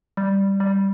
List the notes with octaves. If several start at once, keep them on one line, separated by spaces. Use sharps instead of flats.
G3
G3